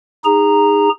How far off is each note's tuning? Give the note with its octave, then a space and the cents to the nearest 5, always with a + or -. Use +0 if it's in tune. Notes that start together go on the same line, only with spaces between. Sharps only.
D#4 +0 G#4 -25 A#5 -5